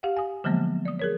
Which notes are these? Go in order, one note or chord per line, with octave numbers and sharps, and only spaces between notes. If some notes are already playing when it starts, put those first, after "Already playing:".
G4 F5 F#5
G#5 D#6
D3 F3 F#3 G#3 A#3 B3
D5 D#6
G#4 A#4 C#5